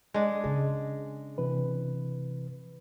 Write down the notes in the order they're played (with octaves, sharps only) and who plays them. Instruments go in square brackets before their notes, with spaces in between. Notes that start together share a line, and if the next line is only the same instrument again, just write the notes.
[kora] G#3 D4
[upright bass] C#3 [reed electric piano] G#4
[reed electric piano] C3 E3 B4